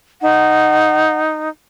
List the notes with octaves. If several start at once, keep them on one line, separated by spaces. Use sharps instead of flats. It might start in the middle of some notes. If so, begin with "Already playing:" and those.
D#4 F#5